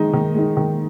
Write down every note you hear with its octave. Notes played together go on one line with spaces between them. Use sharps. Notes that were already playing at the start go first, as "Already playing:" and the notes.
Already playing: D#3 G#3 D#4
D#3
G#3 D#4
D#3